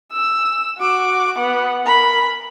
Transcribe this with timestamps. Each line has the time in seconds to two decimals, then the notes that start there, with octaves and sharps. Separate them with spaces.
0.13 E6
0.78 F#4 D6
1.38 B3 F#5
1.85 A#4 B5